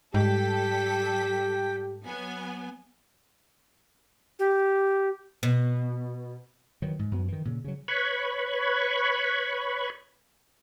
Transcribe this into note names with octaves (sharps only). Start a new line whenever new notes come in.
G#2 G3 G4 A4 G5 B6
F#3 B3 G#5
G4
B2
D#3 E3 F#3
G#2
F#2 F#3 B3
D#3 E3
A#2 C#3
C#3 F#3
B4 C#5 B5 C#6